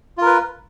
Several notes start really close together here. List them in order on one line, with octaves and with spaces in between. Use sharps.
F4 A#4 B4